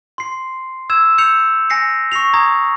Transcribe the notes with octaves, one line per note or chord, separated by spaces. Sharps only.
C6 C7
E6 G#6 E7
E6 G6 G#6 C#7 F7
G#5 A#6 C7 C#7
C#6 A#6 C7 F7
A#5 D#6 G#6